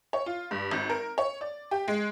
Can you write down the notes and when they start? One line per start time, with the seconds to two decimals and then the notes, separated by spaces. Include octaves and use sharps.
0.13 C#5
0.26 F4
0.51 G2
0.71 G#1
0.90 A#4
1.18 C#5
1.41 D5
1.71 G4
1.88 G#3